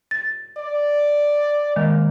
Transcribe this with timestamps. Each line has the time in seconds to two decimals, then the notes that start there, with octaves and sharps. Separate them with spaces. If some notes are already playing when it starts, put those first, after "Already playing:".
0.11 A6
0.58 D5
1.76 D#3 G#3 A#3